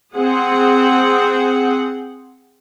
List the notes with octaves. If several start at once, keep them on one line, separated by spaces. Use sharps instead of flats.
C4 G#4 F#5